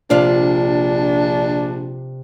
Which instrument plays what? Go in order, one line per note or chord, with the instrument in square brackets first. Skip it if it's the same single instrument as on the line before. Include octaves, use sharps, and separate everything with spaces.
[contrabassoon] A#1 [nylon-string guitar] C3 F4 D5 [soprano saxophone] D4